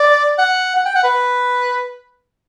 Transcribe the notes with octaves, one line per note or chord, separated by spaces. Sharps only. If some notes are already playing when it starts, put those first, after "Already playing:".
Already playing: D5
F#5
F#5
G5
F#5
B4